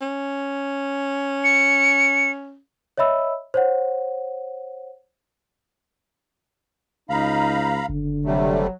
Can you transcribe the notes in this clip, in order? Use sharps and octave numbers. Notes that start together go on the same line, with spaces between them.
C#4
C#7
C#5 D#5 E5 B5 E6
C5 C#5 F#5
C#2 D#4 F5 A#5 B5
F#1 D3
C3 F#3 G3 A3